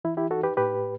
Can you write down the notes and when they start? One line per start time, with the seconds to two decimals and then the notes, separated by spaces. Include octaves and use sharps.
0.04 E3 E4
0.17 E4 G4
0.30 D#4 F#4 A4
0.43 G4 B4
0.57 A2 G4 B4